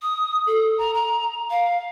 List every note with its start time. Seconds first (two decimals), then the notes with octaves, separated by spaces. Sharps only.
0.02 D#6
0.47 A4
0.78 A#5
0.94 A#5
1.51 F5